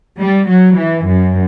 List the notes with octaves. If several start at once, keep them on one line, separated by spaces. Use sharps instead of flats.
G3
F#3
E3
F#2